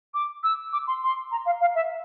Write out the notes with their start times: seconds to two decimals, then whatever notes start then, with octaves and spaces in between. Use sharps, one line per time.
0.14 D6
0.43 E6
0.73 D6
0.87 C6
1.03 C6
1.31 A#5
1.46 F5
1.61 F5
1.75 E5